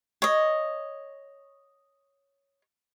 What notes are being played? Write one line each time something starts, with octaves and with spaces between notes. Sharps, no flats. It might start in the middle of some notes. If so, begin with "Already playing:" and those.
C#5 D#5